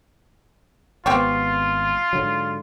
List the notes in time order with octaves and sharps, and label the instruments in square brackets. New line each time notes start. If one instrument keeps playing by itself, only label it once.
[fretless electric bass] G#1 B3 [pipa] C4 G4 C#6 [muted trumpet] F4
[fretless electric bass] G#2 D3 F#3